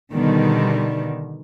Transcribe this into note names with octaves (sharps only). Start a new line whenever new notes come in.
B2 D3 D#3 G3